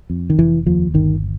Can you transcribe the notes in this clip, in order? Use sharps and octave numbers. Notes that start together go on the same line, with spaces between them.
F2
D#3
F1 E3
D#2 F3
G1 D#3